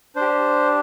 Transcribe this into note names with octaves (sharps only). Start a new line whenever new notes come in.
D4 C5
G4